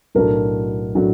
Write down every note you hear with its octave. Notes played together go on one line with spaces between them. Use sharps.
B1 A2 F#3 A3 D4 A#4
A2 F#3 A3 D4